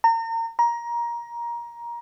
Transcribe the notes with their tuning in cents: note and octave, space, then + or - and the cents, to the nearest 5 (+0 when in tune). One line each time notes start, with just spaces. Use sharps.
A#5 -35
A#5 +20